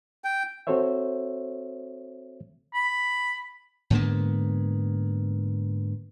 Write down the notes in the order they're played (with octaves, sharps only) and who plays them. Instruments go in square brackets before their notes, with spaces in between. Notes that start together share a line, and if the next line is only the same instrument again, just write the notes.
[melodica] G5
[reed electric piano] C4 F#4 A4 C5 C#5 E5
[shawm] B5
[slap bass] G#2 D3 A#3 B3